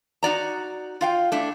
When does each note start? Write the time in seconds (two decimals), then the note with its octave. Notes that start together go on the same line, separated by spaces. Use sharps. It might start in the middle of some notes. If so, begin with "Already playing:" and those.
0.23 D#4 F#4 D5 A#5
1.01 F4 F5 G5
1.32 A3 D4 E4